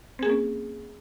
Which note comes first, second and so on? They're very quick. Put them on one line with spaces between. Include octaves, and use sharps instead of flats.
C4 G#4 A#3 C#4